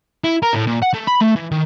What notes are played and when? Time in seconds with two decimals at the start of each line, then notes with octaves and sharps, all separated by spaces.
0.24 E4
0.42 A#4
0.54 A2
0.67 A#2
0.83 F#5
0.94 A3
1.08 B5
1.21 A3
1.36 E3
1.52 D#3